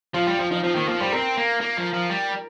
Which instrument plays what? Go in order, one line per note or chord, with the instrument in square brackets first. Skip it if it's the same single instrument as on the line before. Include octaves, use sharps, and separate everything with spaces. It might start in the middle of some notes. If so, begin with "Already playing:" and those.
[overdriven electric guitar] F3 [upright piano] F4
[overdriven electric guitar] G3 [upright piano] F4
[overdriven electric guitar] F3 [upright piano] F4
[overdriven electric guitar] F3 [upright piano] D#4
[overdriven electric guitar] F3 [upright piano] C4
[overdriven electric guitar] D#3 [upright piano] A#3
[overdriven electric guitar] F3 [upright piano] A#3
[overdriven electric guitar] G3 [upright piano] C5
[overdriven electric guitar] C4 [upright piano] A#4
[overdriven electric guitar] A#3
A#3
F3
F3
G3